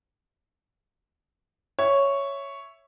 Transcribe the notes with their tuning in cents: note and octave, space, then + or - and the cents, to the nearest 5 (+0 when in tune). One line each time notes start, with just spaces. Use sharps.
C#5 +0 E5 +5